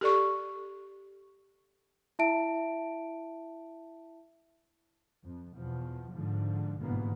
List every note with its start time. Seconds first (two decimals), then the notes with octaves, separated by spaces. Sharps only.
0.01 G4 A4 D5 C#6
2.19 E4 E5 A5 D7
5.24 F2
5.56 E2 B2 F3
6.12 G#2 D3 F3
6.81 G1 G#2 B2 E3 A#3 B3